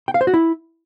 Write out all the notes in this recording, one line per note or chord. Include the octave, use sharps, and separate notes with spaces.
G5
F5
C5
F#4
E4